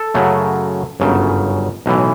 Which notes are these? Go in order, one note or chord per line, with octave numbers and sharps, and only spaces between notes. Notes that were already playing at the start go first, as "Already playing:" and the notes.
Already playing: A4
F#2 C#3 F#3 A3
G1 F#2 C#3
B1 A2 E3